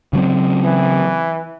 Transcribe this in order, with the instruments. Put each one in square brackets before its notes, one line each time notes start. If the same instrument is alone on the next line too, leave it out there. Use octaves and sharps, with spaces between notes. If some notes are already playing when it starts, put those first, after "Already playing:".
[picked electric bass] C#3 F#3 C4
[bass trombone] E3